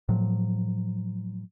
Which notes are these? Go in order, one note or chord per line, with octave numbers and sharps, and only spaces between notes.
A2 F3 F#3